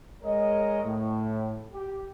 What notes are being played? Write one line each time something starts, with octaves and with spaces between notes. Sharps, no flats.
G#3 A#4 C#5 D#5
A2
G4